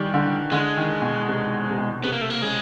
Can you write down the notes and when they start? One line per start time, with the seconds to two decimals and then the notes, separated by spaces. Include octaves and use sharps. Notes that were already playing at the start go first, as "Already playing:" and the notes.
Already playing: D#3 E3 G3
0.14 D3
0.52 D3 G#3
0.77 D#3
1.02 B2
1.28 C3
1.70 C3
1.78 B2
2.04 C3 B3
2.12 A#3
2.21 A3
2.30 A#3
2.42 C#3 G#3